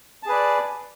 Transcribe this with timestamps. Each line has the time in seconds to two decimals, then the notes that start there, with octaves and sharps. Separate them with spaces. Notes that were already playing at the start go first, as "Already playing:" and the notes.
0.23 A5
0.26 G#4
0.29 B4
0.32 D5